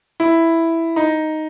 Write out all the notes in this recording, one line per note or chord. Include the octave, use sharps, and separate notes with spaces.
E4
D#4